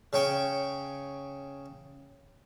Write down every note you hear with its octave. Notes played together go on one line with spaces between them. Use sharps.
C#3 C#5 G5